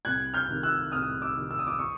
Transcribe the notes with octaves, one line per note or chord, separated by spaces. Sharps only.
C2 F#6 G#6
F6 G6
C3 D#3
E6 F#6
C2 D#6 F6
D6 E6
C3 D#3
E6
D#6
D6 E6
C#6 D#6